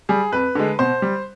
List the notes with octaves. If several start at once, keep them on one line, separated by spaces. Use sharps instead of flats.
G3 G#4
F2 B4
D3 G#3
B2 C5
G3